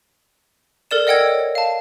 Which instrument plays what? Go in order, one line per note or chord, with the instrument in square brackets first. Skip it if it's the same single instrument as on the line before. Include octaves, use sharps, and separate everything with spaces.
[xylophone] A4 A#4 D5 E7
D5 D#5 F#5 G5 E6 G#6
C#5
F5 A5